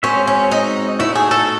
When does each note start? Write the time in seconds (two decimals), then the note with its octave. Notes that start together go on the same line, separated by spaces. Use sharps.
0.03 G#3 C4 C#4 F#4 C5 E5
0.27 C#4
0.51 D#4
0.99 A3 D#4 E4 F#4
1.15 G#4
1.31 A4